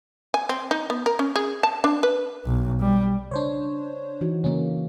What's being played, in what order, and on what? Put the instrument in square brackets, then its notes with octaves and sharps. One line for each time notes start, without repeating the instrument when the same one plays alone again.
[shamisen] G#5
C4
D#4
B3
A#4
C#4
G#4
A5
D4
B4
[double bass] B1
G3
[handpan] C#3 [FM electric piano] D4 C5 C#5
[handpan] E3 D#4 F#4
[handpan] C#3 A#3 [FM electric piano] C#4 D#4